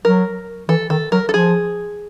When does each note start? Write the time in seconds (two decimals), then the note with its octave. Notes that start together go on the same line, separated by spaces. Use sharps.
0.05 F#3 A#4
0.69 E3 A4
0.90 D#3 A4
1.12 F#3 A#4
1.29 A4
1.34 F3 G#4